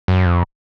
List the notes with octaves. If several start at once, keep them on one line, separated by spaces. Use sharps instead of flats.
F#2
F2